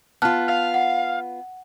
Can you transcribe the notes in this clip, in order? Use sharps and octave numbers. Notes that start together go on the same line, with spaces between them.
B3 F4 A5 F6 F#6
F5
F#5